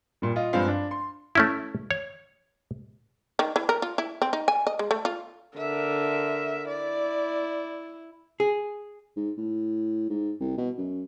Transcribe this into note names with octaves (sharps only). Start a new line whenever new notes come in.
A#2 G3
F4 D#5
G2 F3 G#3 C4 F5
D4
C6
A3 C#4 E4
C#5
D#3
E3
A#4
F4
E4
C4
D#4
G#5
D#5
G#3
A3
F4
D3 A#4 E5
E4 D5
G#4
G#2
A2
G#2
C2
B2
F#2